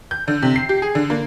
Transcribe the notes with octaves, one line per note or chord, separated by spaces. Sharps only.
G6
D3
C3
C7
G4
G#4
D3
A#3